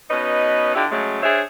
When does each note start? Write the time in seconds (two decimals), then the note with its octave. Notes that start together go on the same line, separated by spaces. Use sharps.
0.10 B2 C#4 D#4 B4 D#5
0.75 D3 D4 E4 F4 G4
0.91 C#3 F#3 G#3 A3
1.23 D4 G#4 C5 C#5 E5